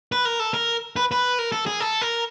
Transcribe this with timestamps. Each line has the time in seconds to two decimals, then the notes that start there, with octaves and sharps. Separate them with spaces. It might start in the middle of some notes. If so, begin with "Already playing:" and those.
0.12 B4
0.25 A#4
0.40 A4
0.54 A#4
0.96 B4
1.11 B4
1.39 A#4
1.52 A4
1.66 G#4
1.80 A4
2.01 A#4